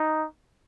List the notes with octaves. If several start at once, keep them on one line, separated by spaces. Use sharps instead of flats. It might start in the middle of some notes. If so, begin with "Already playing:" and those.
Already playing: D#4